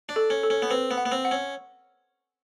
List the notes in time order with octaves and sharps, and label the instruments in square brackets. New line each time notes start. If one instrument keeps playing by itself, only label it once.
[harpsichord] D4
[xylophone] A4
[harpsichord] C#4
[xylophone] A4
[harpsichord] C#4
B3
[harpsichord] C4 [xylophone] B4
[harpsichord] B3
[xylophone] F#5
[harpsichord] B3
C4
[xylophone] F#5
[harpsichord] C#4